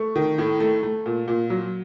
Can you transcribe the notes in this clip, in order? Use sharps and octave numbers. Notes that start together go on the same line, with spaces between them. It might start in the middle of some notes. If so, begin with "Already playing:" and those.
Already playing: A3 C#6
D#3
A2
A3
A3
A#2
A#2
F#3